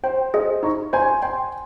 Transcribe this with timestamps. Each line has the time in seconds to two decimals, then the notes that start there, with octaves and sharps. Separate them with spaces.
0.03 C5 G5
0.34 G#4 C5 D#5
0.63 D#4 A#5 C#6
0.93 C5 G#5 C6
1.22 G5 G#5 C6